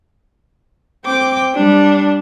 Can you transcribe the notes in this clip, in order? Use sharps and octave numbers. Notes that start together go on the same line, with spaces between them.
C4 G5 D6
G3 D4